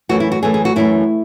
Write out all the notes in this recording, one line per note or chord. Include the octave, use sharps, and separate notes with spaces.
F#2 E3 A3 F#4
E4
F#4
F#2 E3 A3 G#4
G#4
F#4
F#2 E3 A3 E4